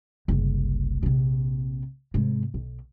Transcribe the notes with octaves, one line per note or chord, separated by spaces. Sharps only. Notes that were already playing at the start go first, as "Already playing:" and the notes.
F#1 C2
A#1 C3
G#2 C3
B1